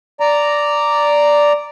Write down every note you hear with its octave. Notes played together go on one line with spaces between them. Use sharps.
D5 A#5